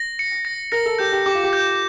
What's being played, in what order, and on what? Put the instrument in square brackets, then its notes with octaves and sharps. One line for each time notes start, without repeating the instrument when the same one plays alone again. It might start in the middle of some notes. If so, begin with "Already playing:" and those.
Already playing: [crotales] A#6
C#7
A#6
[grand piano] A#4 [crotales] A#6
[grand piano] A4
[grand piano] G4 [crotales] G6
[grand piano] G4
[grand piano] G4 [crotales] D6
[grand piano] F4
G4
[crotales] G6